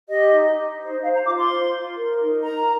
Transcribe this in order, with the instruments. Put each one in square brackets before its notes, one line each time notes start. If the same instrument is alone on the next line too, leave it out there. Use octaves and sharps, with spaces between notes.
[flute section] G4 D#5
D#4
D#4
C5
C5 F5
A#5
F4 D6
C6
C5
F4
A#4
D#4
A#4 A#5